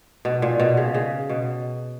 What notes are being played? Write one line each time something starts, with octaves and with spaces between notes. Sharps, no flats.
B2
A#2
B2
C#3
C#3
B2